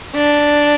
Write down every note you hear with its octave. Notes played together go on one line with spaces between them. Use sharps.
D4